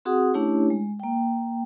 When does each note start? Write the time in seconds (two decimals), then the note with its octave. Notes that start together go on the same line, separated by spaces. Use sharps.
0.05 C4 F#4 G#4 F#5 D#6
0.34 A3 C#4 D4 E4 G4 C#5
0.70 G#3
1.00 A#3 G5